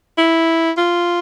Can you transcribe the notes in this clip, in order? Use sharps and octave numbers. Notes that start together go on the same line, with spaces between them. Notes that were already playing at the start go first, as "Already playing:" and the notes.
E4
F4